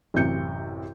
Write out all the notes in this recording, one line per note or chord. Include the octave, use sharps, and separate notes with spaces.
A1 F#2 C3 G6 C#7